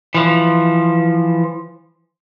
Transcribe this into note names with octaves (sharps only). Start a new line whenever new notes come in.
E3 F3